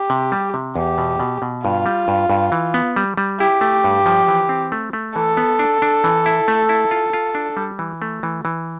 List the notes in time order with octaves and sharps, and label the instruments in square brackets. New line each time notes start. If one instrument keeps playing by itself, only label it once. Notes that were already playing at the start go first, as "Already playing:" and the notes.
Already playing: [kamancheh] G4
[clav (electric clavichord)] C3
G3
C3
[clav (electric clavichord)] E2 [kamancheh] G4
[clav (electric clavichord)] B2
B2
B2
[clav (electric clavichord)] G2 [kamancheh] F4
[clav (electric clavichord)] G3
G2
G2
E3
B3
G3
G3
[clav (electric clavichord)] E4 [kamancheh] G4
[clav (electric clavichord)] A3
G2
F3
E3
C4
A3
A3
[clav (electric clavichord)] E3 [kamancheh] A4
[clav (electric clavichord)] B3
D4
D4
E3
E4
A3
E4
F4
F4
D4
G3
E3
A3
E3
E3